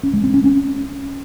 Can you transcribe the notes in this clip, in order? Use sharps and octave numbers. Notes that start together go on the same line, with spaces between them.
C#4
G#3
C4
C#4
C#4